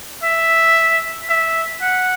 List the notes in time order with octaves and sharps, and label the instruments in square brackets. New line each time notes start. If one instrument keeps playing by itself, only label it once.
[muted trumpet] E5
E5
F#5